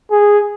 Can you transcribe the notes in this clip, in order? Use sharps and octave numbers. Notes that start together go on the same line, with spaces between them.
G#4